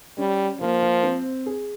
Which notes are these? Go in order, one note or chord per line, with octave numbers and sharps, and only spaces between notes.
G3 C#4
F3 A#3
A#3
C4
G#4